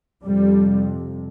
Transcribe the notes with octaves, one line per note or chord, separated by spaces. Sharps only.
F2 C3 G3